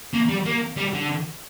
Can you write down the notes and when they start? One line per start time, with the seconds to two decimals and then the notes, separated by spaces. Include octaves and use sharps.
0.13 A#3
0.29 G3
0.45 A#3
0.77 G3
0.93 D3